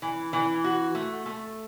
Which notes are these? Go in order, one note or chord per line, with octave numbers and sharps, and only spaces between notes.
E3
E3
F#4
A3
A3